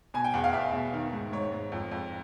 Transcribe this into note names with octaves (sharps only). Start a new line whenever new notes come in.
B2 G#5
G5
E2 F#5
F5
E2 E5
B2
D#3
G#2
G#2 C#5
G#2
F2
F2